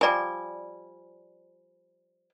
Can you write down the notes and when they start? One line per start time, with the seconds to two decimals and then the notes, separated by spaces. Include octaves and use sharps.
0.01 F3 G3 D5 G#5